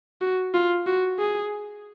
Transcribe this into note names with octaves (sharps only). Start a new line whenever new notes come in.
F#4
F4
F#4
G#4